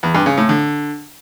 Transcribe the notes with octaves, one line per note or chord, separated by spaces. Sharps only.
E2
G2
C#3
A2
D3